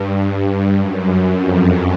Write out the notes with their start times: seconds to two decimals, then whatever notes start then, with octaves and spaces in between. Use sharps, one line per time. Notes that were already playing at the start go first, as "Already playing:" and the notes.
Already playing: G2
0.24 G2
0.79 F#2
1.33 F2